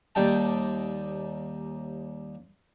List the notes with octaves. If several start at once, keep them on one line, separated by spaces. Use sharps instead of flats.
D#2 G3 D#4 G5 A5